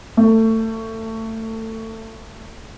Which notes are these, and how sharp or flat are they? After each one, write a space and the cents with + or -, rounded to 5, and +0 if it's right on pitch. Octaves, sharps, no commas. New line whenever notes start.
A3 +25